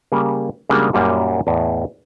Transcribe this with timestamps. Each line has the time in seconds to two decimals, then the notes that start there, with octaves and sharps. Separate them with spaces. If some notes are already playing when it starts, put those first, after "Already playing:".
0.12 C#3 G3 A#3
0.69 C#3 G3 G#3 A#3 D4 F#4
0.93 F#2 A#2 G3 A#3 D#4 F#4
1.47 E2 A2 D#5 E5